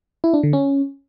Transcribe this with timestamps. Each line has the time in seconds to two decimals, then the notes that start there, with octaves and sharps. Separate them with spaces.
0.24 E4
0.34 D4
0.43 D3
0.53 C#4